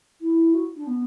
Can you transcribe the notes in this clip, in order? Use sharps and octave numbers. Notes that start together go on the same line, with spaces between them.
E4
F#4
D4
B3